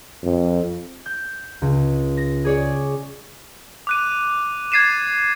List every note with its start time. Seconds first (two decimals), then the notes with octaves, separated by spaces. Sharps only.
0.23 F2
1.06 G6
1.62 C#2
2.17 A#6
2.44 G#4 C#5 D5
3.87 D6 F#6 D#7
4.72 G#6 A6 C7 D#7 E7